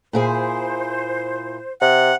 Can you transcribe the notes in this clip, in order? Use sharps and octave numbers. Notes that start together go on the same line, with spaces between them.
A#2 E4 G#4 C5
C3 F#5